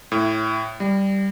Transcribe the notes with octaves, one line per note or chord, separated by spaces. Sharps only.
A2
G3